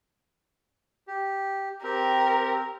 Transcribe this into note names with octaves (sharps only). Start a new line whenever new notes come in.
G4
C4 G4 A#4